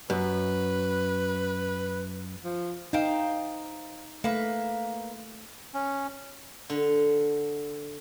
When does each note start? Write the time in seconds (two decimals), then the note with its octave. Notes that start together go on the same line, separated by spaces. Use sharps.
0.10 F#2 B4
2.44 F3
2.93 D#4 C5 F5 G5
4.24 A3 A#3 B4
5.74 C#4
6.70 D3